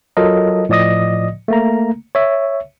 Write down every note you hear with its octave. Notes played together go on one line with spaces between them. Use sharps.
F#3 F4 A4 A#4 D#5
A2 F3 D5 D#5 D#6 A#6
A3 A#3 A#5
C#5 E5